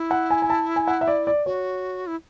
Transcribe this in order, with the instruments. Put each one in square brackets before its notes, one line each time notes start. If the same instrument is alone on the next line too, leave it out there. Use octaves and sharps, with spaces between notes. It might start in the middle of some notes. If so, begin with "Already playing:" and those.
Already playing: [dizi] E4
[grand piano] F#5
G#5
G#5
A5
G#5
F#5
E5
D5
D5
[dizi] F#4 [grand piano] C#5
[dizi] E4